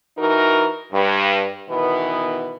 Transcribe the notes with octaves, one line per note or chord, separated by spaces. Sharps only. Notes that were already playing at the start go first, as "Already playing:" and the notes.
E3 D#4 F#4 A#4
G2
B2 D#3 E3 B3